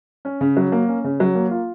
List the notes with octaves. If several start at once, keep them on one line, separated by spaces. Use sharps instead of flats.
C#4
C#3
F#3
A#3
C#4
C#3
F#3
A#3
F4